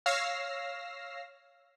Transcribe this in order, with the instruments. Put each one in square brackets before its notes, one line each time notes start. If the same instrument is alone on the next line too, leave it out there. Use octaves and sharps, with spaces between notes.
[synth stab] C#5 F5 E6 F6 A#6 C7